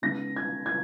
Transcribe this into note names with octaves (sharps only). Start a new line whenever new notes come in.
C#3 G#3 B3 D#4 A#6
G#6
G#6